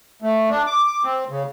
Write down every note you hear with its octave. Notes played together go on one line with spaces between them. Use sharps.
A3
D4
D6
C4
C#3